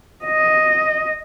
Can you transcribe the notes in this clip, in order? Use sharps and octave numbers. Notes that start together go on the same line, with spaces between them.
D#5